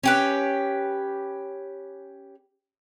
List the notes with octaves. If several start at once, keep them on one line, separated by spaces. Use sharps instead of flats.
C#4 G4 B4